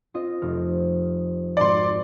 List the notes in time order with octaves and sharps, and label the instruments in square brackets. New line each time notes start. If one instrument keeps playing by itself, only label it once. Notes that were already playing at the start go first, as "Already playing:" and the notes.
[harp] C4 F4 D#5
F1 F3 F6
[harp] G#1 B5 C#7 [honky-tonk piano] D5 C6